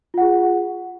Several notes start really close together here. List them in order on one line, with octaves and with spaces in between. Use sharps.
F4 F#5 G#4